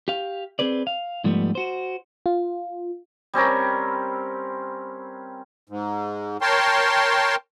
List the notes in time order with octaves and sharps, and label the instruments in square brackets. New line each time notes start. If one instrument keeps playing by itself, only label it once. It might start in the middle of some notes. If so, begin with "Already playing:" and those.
[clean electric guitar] G4 F5
C4 G#4 B4 D5
F5
G#2 F3 G3 A3 B3
F#4 C5
[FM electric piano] F4
[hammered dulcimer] G3 C4 C#4 A#4
[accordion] G#2
A#4 C#5 G5 A5 C6